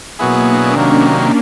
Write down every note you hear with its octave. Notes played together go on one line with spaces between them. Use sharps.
B2 F#3 A#3 B3 E4 G#4
D4
C3 D#3 F#3 A#3 C#4